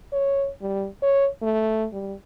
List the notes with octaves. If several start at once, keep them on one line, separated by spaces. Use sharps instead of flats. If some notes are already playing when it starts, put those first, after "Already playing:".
C#5
G3
C#5
A3
G3